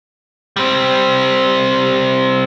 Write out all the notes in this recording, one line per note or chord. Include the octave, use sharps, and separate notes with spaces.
G3 C4